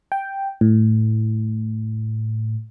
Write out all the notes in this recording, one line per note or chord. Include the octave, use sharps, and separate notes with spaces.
G5
A2